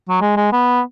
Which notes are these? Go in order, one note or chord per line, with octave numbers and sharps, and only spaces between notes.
F#3
G#3
G#3
B3